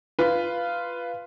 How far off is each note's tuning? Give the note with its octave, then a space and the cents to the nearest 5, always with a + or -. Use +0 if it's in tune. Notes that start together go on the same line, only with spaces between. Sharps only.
F4 -10 B4 +0